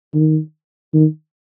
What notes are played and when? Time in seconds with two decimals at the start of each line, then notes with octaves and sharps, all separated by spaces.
0.14 D#3
0.94 D#3